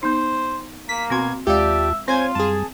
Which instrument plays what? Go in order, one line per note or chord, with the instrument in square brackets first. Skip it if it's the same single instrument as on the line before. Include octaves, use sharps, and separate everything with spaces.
[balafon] B3 D#4 [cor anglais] C5
[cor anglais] A#3 [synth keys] B6
[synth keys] B2 G#6 [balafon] C4 F#4 C6
[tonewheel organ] D#2 F4 A5 [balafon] G#3 F5 [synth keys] G4 D5 [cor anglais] E5
[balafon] C4 C6 [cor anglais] F4 [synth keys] C5 G#5 G#6 [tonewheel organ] C#5
[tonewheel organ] F#2 G3 [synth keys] G#4 A5